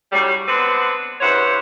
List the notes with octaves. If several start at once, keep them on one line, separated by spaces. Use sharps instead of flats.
A2 C#3 F#3 G3
G#3 B3 C4 D4 B4 F#5
G2 C#3 E3 C5 C#5 F#5